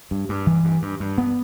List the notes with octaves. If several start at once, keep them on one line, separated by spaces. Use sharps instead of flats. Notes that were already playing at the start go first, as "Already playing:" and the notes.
G2
G2
E3
G2
G2
G2
B3